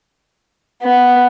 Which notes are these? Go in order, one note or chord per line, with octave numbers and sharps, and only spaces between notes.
B3